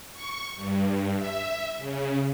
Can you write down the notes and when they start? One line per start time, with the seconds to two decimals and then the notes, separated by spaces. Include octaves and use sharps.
0.13 C#6
0.57 G2
1.17 E5
1.78 C#3